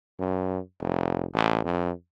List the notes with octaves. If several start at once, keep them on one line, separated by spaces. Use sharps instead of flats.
F#2
F1
A1
F2